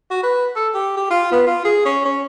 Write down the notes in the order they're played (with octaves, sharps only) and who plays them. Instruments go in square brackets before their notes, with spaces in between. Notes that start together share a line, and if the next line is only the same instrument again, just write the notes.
[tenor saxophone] F#4
B4
A4
G4
G4
F4
B3
F4
G#4
C#4
C#4